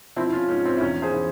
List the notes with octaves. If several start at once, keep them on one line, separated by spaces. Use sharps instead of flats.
F3 C4 E4
E4
C#4 F4
G#2 C#4
C4
E4
E2 C#4
G#4 C5
E3